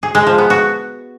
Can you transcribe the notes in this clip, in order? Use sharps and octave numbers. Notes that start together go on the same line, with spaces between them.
G#4
G#3
F3
B3
F#4